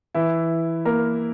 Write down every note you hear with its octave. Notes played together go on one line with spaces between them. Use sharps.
E3 E4
A#3 A#4